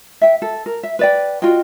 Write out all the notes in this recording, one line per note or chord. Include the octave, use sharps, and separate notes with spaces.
E5 G5
A4
A#4
E5
B4 D5 G5
F4 F#4 D#5 G5